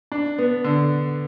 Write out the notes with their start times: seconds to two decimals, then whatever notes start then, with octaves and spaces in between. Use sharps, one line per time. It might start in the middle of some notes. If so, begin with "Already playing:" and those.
0.12 D4
0.38 B3
0.64 D3